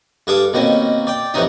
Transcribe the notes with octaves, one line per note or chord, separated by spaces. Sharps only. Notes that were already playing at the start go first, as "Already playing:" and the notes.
G2 G#4 A4 F5 D6
B2 D#3 A#3 C4 C#4
D5 G5
F2 A2 C3 E3 C#4 D#4